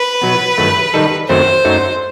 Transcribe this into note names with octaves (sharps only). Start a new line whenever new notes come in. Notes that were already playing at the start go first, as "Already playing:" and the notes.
Already playing: B4
B2 F#3 B3
G2 D#3 F#3 A3
D#3 G3 D#4 A4
F#2 D#3 F#3 A3 C4 C5
F#2 F#3 A3 D#4